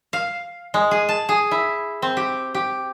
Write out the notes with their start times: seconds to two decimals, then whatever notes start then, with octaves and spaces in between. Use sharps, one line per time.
0.13 F5
0.74 G#3
0.91 G#4
1.09 A5
1.29 G#4
1.51 E4
2.02 C4
2.17 G4
2.54 G4